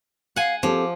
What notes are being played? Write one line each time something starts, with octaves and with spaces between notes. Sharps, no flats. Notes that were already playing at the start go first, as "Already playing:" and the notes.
F5 F#5 G#5
F3 C4 G4 A4 D6